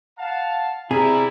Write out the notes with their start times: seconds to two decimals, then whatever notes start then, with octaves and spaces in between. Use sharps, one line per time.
0.19 F5 F#5 A5
0.91 C3 G3 E4 G#4 A#5